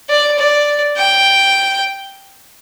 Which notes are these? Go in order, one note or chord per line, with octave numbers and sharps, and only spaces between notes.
D5
D5
G5